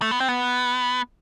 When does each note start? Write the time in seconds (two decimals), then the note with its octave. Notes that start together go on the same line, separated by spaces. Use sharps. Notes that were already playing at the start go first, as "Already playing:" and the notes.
0.02 A3
0.11 B3
0.20 C4
0.29 B3